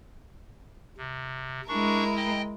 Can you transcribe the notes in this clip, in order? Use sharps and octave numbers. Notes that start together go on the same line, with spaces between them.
C3
G#3 D4 E4 A#4 C#6
D#5 G5